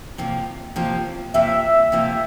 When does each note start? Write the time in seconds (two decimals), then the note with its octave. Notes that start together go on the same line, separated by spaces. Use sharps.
0.18 C3 F3 A#3
0.76 C3 F3 A#3
1.34 C3 F3 A#3 E5
1.92 C3 F3 A#3